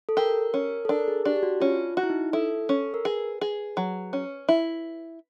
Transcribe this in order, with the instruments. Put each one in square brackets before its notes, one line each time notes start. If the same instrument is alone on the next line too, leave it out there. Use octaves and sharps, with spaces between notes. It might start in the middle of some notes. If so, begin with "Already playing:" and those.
[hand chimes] A4
[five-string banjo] G4 [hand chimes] A#4
[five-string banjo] C#4
[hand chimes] A4
[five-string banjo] D4 [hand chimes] A#4
[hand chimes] G#4
[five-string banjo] D4 [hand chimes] G4
[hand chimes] G4
F#4
[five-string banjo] C#4 [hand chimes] F4
[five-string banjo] F#4
[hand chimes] E4
D#4
[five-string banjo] E4 [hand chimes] A4
[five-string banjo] C#4
[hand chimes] A#4
[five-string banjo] G#4 [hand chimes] B4
[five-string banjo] G#4
F#3
C#4
E4